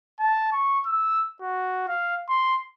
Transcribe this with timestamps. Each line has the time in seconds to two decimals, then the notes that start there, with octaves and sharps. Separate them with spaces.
0.20 A5
0.53 C#6
0.86 E6
1.41 F#4
1.88 F5
2.29 C6